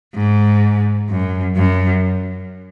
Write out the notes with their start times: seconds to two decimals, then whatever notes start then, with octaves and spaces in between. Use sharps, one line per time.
0.14 G#2
1.09 F#2
1.56 F#2